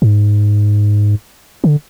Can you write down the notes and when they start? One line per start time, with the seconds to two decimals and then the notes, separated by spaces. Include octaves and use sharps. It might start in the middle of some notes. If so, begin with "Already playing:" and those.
0.02 G#2
1.64 D3